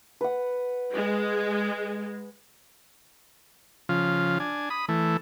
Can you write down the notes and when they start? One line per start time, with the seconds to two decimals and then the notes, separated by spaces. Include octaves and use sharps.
0.21 B4 F#5
0.94 G#3
3.89 C#3 F3 F4
4.40 D4 G#5
4.70 B5 D#6
4.89 E3 A3